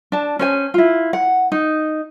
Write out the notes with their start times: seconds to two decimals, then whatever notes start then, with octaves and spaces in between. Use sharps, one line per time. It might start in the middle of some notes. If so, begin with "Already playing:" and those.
0.12 D4 A5
0.39 C#4 C5 G#5
0.74 E4 F4
1.13 F#5
1.52 D#4